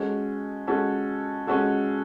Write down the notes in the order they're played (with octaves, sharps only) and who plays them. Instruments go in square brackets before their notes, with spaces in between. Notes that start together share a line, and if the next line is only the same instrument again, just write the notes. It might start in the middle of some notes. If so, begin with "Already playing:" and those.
Already playing: [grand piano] G#3 C#4 F#4 A4
G#3 C#4 F#4 A4
G#3 C#4 F#4 A4